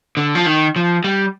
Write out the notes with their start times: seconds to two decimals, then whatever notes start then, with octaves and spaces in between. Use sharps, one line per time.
0.17 D3
0.35 F3
0.46 D#3
0.76 F3
1.04 G3